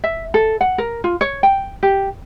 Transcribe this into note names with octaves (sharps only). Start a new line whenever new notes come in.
E5
A4
F#5
A#4
F4
C#5
G5
G4